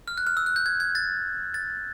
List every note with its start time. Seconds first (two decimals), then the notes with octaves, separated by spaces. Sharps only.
0.08 F6
0.18 F#6
0.27 F6
0.37 E6
0.46 F#6
0.56 G6
0.66 G#6
0.80 G#6
0.95 A6
1.54 A6